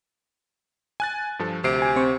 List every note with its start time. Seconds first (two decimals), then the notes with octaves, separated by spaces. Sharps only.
1.00 G#5 F#6 A6
1.39 G2 F3 A4
1.64 D2 C3 C7 D7
1.82 G#5
1.96 C4 C5 C#6